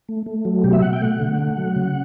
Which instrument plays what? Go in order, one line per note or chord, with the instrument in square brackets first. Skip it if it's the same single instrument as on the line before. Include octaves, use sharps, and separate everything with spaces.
[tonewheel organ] A3
A3
F#3
B2 G4
E5
B2 F#5
G5
A3 F#5
D3
A3
F#3
C#3